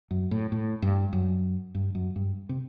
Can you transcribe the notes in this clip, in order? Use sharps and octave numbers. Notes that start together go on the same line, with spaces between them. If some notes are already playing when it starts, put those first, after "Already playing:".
F#2
A2
A2
G2
F#2
G2
F#2
G2
C3